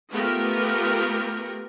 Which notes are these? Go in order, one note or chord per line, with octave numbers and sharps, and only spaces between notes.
A3 B3 F4 G4 A#4